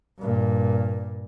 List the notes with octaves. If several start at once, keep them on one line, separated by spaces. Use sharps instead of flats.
G2 A#2